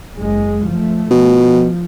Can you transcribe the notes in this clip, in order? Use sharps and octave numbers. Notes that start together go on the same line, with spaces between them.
F#1 G#3
F3 A3
B2 F3